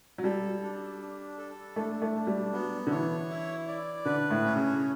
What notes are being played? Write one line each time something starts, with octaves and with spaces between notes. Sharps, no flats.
F#3
G3 A4
D4
D4
A4
A3 D4
A3
D4
G3
F#3 B3
D3
E3 C#5
E4
D5
D3 B4
A2
C#4
C#3